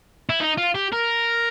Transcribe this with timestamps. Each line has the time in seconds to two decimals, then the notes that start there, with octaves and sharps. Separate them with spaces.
0.30 E4
0.40 D#4
0.58 F4
0.75 G4
0.93 A#4